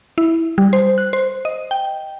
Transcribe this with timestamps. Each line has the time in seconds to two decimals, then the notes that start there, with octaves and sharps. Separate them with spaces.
0.18 E4
0.58 G3
0.73 C5
0.98 F#6
1.13 C5
1.45 D#5
1.71 G5